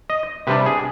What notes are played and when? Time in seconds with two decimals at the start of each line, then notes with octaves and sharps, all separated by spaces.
0.10 D#5
0.47 C3 G3 D4 B4
0.66 G#4